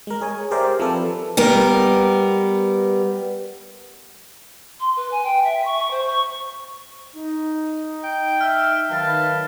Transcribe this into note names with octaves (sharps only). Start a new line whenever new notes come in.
G#3 A#4
G#4 C#5 G#5
G4 G#4 A#4 C5 D5 E5
F3 C4 A4 B4
G3 B3 A#4
C6
B4
G#5
G5
E5
C#6
C#6
C5
C#6
D#4
G5
E5 F6
D#3 F#3 B4 F5 A5